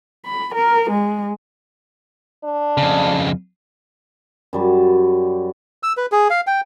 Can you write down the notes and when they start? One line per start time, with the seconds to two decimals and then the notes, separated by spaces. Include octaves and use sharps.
0.25 B5
0.54 A#4
0.90 G#3
2.44 D4
2.77 F2 C#3
4.53 F#2 G3 A5
5.83 E6
5.97 B4
6.12 G#4
6.30 F5
6.47 G5